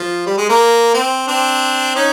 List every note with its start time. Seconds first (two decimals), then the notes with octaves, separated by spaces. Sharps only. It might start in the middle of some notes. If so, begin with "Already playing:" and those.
Already playing: F3
0.26 G3
0.38 G#3
0.49 A#3
0.94 C4
1.28 C4 D4
1.95 C#4 D#4